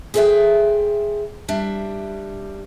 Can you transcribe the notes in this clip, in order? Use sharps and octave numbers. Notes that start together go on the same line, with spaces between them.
G#4 A4 C5 D5 E5 G5
G3 D4 E5